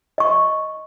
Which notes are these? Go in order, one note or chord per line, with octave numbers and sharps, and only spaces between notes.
D#5 C#6